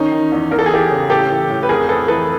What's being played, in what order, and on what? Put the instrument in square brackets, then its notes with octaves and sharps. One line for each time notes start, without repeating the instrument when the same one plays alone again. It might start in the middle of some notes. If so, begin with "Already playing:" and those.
Already playing: [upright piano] D#3 C#4 D#4
D#3
E2
E2 A#4
A4
G#4
E3 G4 A4
C#3
A2 G4 A4
E3
A2
B4
F2 G#4 A#4
F2 A4 B4
E3 A4 B4